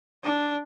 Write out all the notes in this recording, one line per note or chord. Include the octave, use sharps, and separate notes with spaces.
D4